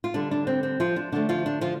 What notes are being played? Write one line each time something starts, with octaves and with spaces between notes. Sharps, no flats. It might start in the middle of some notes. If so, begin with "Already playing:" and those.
F4
D3 G3 D4
D4
C4
C4
F3 F4
D4
D3 F3 A3 D4
F3 F4
D4
F3 F4